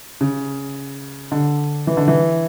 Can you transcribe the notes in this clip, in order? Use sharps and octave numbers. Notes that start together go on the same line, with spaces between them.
C#3
D3
E3
D3
E3